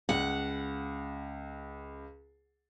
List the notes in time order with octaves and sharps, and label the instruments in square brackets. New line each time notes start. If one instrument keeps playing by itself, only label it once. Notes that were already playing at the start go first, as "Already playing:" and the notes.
[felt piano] C#2 [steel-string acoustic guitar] F#5